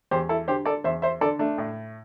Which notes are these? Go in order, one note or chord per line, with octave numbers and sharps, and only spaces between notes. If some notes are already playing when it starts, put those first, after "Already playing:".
E2 G4 C5
E4 A4
D3 G4 C5
A4 D5
E2 C5 E5
C5 E5
D3 A4 D5
A3 D4
A2